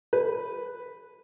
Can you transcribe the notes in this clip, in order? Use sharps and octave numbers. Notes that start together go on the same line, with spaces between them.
B4